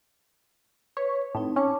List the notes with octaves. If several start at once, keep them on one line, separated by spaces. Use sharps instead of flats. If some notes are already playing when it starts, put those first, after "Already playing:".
B4 C#5
A2 C4 D#4
C#4 A5 C#6 D6